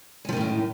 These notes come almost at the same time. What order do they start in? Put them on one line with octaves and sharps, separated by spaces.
G#3 F3 D#3 A2 F#2